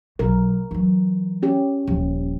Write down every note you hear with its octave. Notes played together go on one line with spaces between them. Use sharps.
B1 A#4
E3 F#3
C#4 G4
D#1 F3